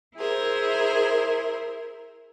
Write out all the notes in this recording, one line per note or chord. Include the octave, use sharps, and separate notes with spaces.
E4 G#4 A#4 C5